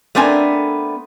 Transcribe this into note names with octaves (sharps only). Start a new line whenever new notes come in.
A3 B3 C4 D4 A#4 G#5